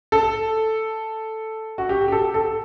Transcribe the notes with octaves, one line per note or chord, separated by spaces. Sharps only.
A4
F#4
G4
G4
A4
A4